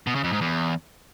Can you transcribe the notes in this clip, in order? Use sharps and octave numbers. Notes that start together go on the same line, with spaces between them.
B2
C#3
F2
G#2
E2